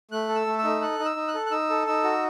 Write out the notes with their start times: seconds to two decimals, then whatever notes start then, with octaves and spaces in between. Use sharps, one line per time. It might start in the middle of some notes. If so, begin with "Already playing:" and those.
0.11 A3 F#6
0.29 A4
0.35 E6
0.46 A3
0.59 E6
0.64 D#4
0.81 A4 F#6
0.99 D#4
1.05 E6
1.16 D#4
1.28 F#6
1.35 A4
1.46 F#6
1.51 D#4 E6
1.70 A4
1.87 D#4 E6
2.04 F#4